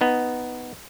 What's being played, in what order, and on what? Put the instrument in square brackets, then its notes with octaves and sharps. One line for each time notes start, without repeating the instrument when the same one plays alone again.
[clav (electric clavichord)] B3 D#4